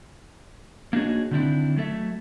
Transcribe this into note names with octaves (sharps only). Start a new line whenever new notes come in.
A#3 D4 D#4 F#4 G#4 C#5
D3 D#3 C4 D4 E4
F#3 A3 A4 E5